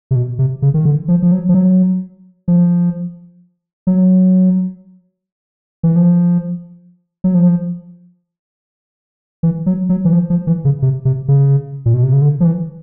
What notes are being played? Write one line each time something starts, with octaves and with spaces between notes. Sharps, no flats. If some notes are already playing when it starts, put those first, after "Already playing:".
C3
B2
C3
C#3
D#3
D3
F3
F3
F#3
F3
F#3
F3
F#3
E3
F3
F#3
F3
E3
F#3
F#3
E3
F3
F3
E3
C#3
C3
C3
C#3
A#2
B2
C3
C#3
D3
F3
E3